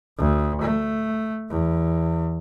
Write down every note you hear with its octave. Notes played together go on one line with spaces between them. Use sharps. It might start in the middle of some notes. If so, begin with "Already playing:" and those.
D2
A3
E2